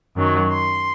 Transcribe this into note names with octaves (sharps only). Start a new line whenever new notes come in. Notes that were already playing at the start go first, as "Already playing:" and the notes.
F#2 D#3 F#3
C6